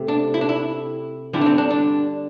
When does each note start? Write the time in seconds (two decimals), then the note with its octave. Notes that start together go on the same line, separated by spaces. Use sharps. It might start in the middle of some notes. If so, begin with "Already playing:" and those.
Already playing: C3 A3
0.08 D4
0.34 E4
0.41 D4
0.49 E4
1.33 D3 G3 E4
1.41 D4
1.46 C4
1.58 D4
1.70 D4